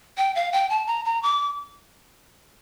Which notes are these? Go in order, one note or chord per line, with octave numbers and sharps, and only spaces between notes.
G5
F5
G5
A5
A#5
A#5
D6